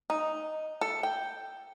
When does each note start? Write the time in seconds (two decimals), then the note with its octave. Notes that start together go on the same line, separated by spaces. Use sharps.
0.10 D#4
0.81 A4
1.03 G5